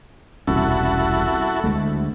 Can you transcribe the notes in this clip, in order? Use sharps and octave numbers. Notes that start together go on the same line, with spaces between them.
E1 C2 C#4 E4 F#4 A4
D2 G#3 A3